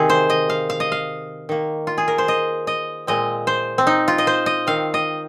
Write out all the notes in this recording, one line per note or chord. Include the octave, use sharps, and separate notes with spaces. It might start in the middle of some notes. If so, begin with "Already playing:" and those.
Already playing: C3 D#3 C4 G#4
C5
D#5
F5
F5
D#5
F5
D#3 A#3
F4
G#4
A#4
C5
D#5
D#5
A#2 G#3 C4 D#5
C5
C4
D#4
F4
D#5
C5
D#5
D#3 C4 F5
D#5